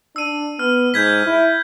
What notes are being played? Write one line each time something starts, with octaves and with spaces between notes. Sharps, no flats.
D4 E6 D#7
B3 F6
G#2 G6 G#6 B6
E4